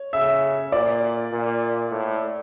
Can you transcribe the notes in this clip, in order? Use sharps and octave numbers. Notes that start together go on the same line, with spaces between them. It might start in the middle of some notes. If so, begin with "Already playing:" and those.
Already playing: C#5
C#3 E5
A#2 D5
A#2
A2